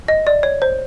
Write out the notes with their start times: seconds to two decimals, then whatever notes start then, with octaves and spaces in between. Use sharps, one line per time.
0.08 D#5
0.27 D5
0.43 C#5
0.62 C5